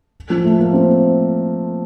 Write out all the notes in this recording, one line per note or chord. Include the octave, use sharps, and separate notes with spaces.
F3
A3
A#3
C4